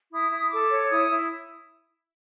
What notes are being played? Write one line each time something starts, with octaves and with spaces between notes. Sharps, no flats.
E4 D#6
E4
A4 D6
C#5
E4 D#6
E4